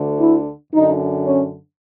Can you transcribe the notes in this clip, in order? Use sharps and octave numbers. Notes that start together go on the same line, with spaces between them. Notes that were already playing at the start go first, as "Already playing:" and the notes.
Already playing: D2 D3
E4
F#2 D3 D#4
C#4